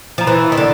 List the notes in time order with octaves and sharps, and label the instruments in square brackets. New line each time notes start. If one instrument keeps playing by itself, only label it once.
[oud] F3 [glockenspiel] A#5
[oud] E3 [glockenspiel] B5
[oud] D#3
D3